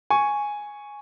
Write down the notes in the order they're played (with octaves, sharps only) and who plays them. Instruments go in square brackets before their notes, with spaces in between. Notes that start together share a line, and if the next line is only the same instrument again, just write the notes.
[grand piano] G#5 C#6